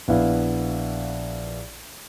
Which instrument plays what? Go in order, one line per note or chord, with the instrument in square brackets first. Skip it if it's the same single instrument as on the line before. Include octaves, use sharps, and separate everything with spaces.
[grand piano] A#1 B3 E4 F5